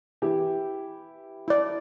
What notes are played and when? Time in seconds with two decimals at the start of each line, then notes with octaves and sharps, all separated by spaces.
0.22 E3 E4 G4
1.48 E4 D5